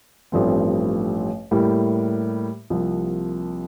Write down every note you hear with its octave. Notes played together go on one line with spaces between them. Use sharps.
A1 G2 F3 A3 C4
A2 G3 A#3
C2 C3 F3 A#3